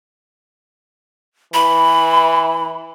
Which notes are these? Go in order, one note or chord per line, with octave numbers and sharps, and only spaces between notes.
E3 B5